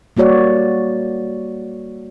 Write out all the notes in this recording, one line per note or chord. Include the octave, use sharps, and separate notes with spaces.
G3 A#3 F#4 C#5 D5